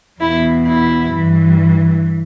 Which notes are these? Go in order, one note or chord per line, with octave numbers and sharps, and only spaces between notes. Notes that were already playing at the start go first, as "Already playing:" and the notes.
E2 B2 E4
E4
G2 E3